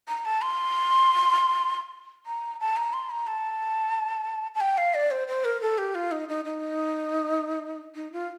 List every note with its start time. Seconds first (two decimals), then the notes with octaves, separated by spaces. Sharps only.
0.09 A#5
0.25 A5
0.42 C6
2.26 A#5
2.60 A5
2.77 A#5
2.93 C6
3.10 A#5
3.27 A5
4.55 A5
4.61 G5
4.78 F5
4.94 D5
5.11 C5
5.28 C5
5.45 A#4
5.62 A4
5.78 G4
5.95 F4
6.12 D#4
6.29 D#4
6.45 D#4
7.95 D#4
8.12 F4